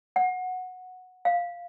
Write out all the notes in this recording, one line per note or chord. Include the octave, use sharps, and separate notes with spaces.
F#5
F5